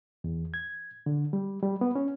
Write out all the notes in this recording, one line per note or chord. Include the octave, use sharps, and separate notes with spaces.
E2
G#6
D3
G3
G3
B3
C#4